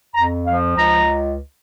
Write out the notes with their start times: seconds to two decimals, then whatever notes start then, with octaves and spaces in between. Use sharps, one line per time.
0.15 F2 A#5
0.47 F3 F5
0.77 C#2 A#5